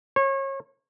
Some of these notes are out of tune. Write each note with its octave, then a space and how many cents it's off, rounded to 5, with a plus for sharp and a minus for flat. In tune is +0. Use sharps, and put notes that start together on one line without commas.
C#5 -30